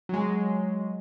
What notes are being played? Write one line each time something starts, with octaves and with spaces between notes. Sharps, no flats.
F#3 G#3